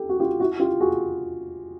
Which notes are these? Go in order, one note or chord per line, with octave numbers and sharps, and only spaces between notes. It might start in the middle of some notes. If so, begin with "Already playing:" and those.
Already playing: G4 A4
F#4
F4 G4
E4 F#4
F4 G4
F#4 G#4